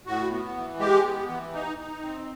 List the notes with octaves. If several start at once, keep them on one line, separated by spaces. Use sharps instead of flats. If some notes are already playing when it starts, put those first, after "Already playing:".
A2 F#4
B3
E3
G#3 G4
B3
E3
D#4
D#4
C4